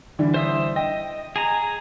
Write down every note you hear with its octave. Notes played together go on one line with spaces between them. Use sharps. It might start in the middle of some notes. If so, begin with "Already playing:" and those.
D3 E3 G3
C5 E5 D#6
D#5 G5
G#4 G#5 A#5